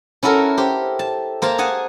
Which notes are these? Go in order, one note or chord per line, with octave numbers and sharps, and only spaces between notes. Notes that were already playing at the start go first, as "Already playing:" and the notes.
C#4 E4 F#4 A4 A#4
G4 C5
A5
A#3 C5 F5 A5
G#4 F#5 G#5 A5